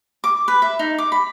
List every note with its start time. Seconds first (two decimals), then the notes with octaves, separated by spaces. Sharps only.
0.24 D6
0.48 B4
0.62 E5
0.79 D#4
0.98 D6
1.12 B5